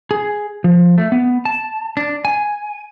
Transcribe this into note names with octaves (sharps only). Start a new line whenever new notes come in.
G#4
F3
A3
B3
A5
D4
G#5